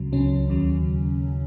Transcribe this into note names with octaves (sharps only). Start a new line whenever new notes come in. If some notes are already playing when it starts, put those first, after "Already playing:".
Already playing: C#2 C#3 F#3
C#2 C#3 F#3 C#4
D#2 C#3 F#3